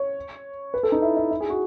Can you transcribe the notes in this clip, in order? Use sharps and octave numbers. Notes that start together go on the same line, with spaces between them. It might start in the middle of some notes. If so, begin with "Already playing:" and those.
Already playing: C#5
B4
A4
D#4
E4
E4
E4
G#4
F#4